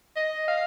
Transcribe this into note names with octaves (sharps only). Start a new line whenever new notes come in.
D#5
F5